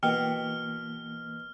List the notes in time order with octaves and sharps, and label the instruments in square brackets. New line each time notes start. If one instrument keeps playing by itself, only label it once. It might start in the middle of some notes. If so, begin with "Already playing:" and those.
[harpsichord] B2 [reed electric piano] E3 A#3 [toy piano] G5 [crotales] F6